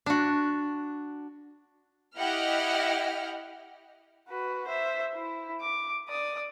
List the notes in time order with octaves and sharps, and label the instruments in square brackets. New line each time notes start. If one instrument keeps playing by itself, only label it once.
[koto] D4 F#4
[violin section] E4 G4 D#5 F#5 G5 F6
[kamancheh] F#4 B4
C5 E5
E4
D6
D5 D#6